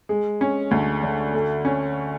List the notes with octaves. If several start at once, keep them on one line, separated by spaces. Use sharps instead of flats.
G#3
C#4
D2
D3
A3
C#4